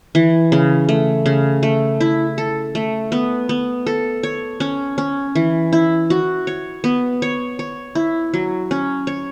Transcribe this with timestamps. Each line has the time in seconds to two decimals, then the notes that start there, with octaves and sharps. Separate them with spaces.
0.15 E3
0.52 C#3
0.89 A3
1.26 C#3
1.63 A3
2.00 E4
2.38 A4
2.75 A3
3.12 B3
3.49 B3
3.86 A4
4.23 C#5
4.60 C#4
4.98 C#4
5.35 E3
5.73 E4
6.10 F#4
6.47 C#5
6.84 B3
7.22 C#5
7.59 C#5
7.95 E4
8.34 F#3
8.71 C#4
9.07 C#5